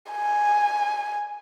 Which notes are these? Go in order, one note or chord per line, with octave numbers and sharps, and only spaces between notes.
G#5